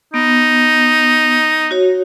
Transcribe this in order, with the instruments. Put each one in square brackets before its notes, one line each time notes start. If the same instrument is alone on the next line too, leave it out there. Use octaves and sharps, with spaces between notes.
[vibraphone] B3 [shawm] D#4
[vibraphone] F#4 C#5